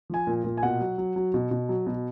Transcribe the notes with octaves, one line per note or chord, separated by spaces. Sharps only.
F3 G#5
A#2
A#2
G#5
B2 F#5
F#3
F#3
F#3
B2
B2
F#3
B2